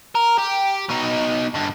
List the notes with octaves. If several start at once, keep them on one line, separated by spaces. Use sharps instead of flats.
A#4
G4
B2 D#4
G2 D3